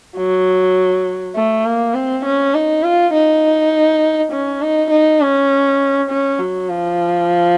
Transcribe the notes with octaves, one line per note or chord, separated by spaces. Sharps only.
F#3
A3
A#3
C4
C#4
D#4
F4
D#4
C#4
D#4
D#4
C#4
C#4
F#3
F3